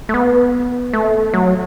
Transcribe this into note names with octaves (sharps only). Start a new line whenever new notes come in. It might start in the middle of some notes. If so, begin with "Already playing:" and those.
A3
B3
A3
F#3